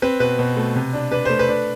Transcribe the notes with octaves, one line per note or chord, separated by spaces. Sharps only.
C4 B4
B2 B4
B2
A3
C3
D4
D4 B4
A3 C5
B4
D4